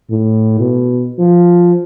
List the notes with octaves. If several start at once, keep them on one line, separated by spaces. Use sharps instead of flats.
A2
B2
F3